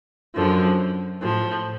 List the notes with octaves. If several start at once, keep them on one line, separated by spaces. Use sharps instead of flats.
F#2 D3 F3
A2 F3